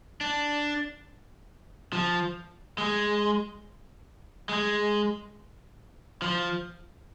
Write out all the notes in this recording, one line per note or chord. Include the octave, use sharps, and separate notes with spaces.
D4
F3
G#3
G#3
F3